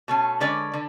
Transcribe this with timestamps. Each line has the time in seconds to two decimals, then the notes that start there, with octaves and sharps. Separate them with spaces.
0.08 B2 A3 C#4
0.40 D3 G#3 C#4 B4 D5
0.74 D3